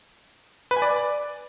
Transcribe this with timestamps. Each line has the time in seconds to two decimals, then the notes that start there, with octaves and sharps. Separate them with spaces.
0.71 B4
0.77 G#5
0.82 D5